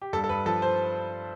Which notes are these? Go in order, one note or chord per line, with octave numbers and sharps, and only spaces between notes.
G4
G2 A4
A4
G2 B4
F3 A4
C5